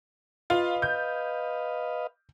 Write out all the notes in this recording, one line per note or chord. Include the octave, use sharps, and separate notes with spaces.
F4 B4 D#5 F5
G6